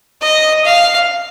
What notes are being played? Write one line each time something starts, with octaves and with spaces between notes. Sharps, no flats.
D#5
F5